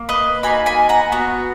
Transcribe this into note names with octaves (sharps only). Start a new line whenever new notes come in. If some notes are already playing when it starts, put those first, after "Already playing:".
Already playing: A#3
B4 D#5
A#3 D#4 F#4 G#5 B5
G#5 B5
F#5 A#5
B3 F#4